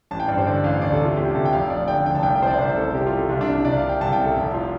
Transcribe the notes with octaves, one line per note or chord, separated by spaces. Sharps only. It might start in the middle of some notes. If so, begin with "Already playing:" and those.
A1 A5
G5
G2 D5
C5
D3 D5
A1 F5
D2 D5
A4
C3
F4
D2 G4
C3 A4
G5
F1 F5
F2 D5
D3 G5
F1 G5
A5
C2 G5
G5
C3 C5
D5
C2 C5
C3 A4
C2 G4
F4
C3
A4
C2 F4
D4
C3
D4
C2 D5
F5
C3
G5
C2 A5
G5
C3
A4
F1
F4